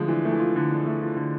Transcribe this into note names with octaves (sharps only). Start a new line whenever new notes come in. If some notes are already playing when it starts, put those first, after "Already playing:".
Already playing: D3 F3 G#3 A3 F4
E3 D4
A3
E3
F4
D3
D4
A3
F4
D3